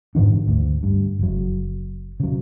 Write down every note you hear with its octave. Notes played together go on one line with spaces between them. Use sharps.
G#2 D3 E3 D4
D2
G2
F#1 F#3
C#3 F#3